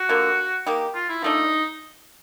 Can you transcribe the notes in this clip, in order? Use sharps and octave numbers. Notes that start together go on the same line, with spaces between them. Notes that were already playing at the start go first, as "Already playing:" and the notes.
Already playing: F#4
D3 F3 A#3
A#3 D#4 G4
F4
E4
F3 A3 D4 D#4